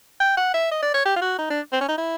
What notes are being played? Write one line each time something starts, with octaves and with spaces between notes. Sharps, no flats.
G5
F#5
E5
D#5
D5
C#5
G4
F4
F#4
D#4
D4
C4
C#4
D#4
E4